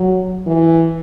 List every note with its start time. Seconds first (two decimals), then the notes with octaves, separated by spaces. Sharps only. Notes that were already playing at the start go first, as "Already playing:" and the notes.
Already playing: F#3
0.47 E3